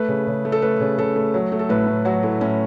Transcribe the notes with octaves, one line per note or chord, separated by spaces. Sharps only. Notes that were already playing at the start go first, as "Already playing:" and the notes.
Already playing: A3 B4
C#3
C#3
A3
A4
A3 B4
C#3
C#3 A4
A3
F#3
A3
A4
A2 B4
A2
F#3 F#4
A3 E4
A2 C#4